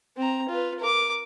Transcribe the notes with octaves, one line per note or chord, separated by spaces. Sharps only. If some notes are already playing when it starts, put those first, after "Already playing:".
C4 A#5
F4 B4
A#4 D6